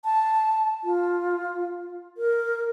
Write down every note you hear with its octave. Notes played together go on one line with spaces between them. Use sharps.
A5
F4
A#4